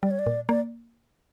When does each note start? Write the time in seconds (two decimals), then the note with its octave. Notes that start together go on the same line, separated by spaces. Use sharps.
0.03 G3 D5
0.11 C#5
0.19 D5
0.26 A#2
0.49 A#3 D5